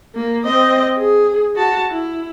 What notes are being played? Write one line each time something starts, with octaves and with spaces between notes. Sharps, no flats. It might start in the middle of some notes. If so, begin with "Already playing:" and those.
A#3
C4 D#5
G#4
F#4 A5
E4